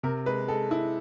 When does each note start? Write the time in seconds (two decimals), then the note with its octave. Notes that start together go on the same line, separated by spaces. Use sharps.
0.03 C3 A#4
0.26 G#3 B4
0.48 G#3 A4
0.71 G#3 E4